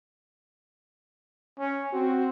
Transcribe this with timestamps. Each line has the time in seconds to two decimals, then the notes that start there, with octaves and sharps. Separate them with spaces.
1.59 C#4
1.93 C4 F#4